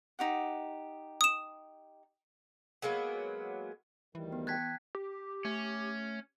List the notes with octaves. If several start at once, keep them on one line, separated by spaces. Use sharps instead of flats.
D#4 G4 F#5
D#6 E7
F#3 G#3 A#3 B3
D2 D#3 E3 G3
B3
G5 A5 F#6 G#6 A6 B6
G4
A3 C#4